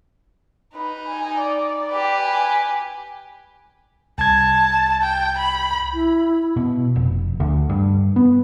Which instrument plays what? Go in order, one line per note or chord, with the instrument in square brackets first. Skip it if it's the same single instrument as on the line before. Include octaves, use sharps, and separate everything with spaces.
[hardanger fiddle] D#4 [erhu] B4
[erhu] G#5
D5
[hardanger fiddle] G4 B4
[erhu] G#5
[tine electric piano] C2 G#6 [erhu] A5
[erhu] G5
B5
[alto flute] E4
[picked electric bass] B2
F1
D2
G2
B3